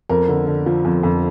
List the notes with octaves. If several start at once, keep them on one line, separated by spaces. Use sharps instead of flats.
F2 A#4
D3
D3
F3
F2
F2